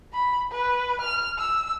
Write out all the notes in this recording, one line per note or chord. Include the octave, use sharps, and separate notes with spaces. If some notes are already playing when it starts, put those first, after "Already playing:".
B5
B4
F6
E6